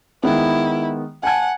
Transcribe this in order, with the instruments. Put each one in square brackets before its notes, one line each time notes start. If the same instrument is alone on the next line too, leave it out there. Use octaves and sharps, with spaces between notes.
[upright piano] D#3 G#3 B3 [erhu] E4
[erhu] F#5 [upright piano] G#5 A5 G#6